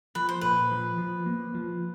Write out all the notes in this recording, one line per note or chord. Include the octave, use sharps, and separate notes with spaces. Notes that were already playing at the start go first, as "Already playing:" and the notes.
F3 B4
C5
A#2 B4
F3
F3
A#3
F3